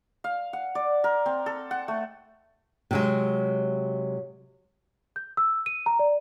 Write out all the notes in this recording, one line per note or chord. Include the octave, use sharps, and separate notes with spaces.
F5
F#5
D5
A#4
C4
A4
F#5
A3
C3 F#3 G#3
G6
E6
D#7
A#5
D5